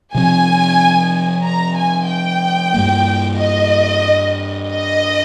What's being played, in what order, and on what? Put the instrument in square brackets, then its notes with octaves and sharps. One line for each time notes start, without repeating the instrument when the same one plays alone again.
[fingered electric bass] C3 F3 C4 [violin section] G#5
[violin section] A#5
G#5
G5
[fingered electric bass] G2 G3 A#3
[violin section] D#5
D#5